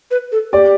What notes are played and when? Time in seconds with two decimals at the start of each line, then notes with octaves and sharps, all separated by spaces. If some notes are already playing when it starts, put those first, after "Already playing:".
0.11 B4
0.32 A4
0.53 G4 D5